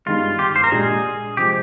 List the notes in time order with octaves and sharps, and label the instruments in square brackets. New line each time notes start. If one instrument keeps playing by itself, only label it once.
[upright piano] G1 G2 D#3 G#3 [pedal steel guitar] F4
[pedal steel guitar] G4
C5
A#4
[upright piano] A#1 A#2 G#3 D4 G4 [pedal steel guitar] G#4
[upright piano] C3 F3 G#3 [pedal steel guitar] G4